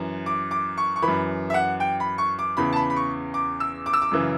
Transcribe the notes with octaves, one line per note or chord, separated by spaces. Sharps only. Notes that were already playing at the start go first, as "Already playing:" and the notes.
Already playing: F#2 E3
D6
D6
C#6
C#6
E3 B5
F#2
E5
F#5
G5
B5
C#6
D6
E2 C#3 E3 B5
A5
B5
B5
C#6
D6
E6
D6
E6
D6
F#2 C#3 E3